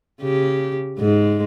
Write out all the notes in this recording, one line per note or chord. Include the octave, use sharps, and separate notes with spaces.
C#3 G4
G#2 G#3